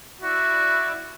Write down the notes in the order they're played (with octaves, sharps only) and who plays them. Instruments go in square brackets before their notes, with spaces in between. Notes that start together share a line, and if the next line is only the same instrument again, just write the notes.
[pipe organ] E4 D5 E5 [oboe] F#4